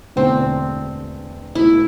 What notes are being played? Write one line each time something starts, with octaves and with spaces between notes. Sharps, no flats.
E1 E2 D3 A3 C4
B1 B2 A3 E4